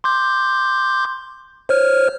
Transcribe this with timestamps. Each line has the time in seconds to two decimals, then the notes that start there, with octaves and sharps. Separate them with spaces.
0.04 C6 D6 G6
1.69 C5 C#5 F6